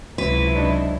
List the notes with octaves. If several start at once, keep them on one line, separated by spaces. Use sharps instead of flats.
C#2 C3 F#3 E4 B4
D4 D#4